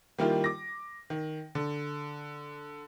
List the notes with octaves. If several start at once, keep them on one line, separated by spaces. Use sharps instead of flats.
D#3 G3 A#3 E4 F4 G4
D6 A#6
D#3
D3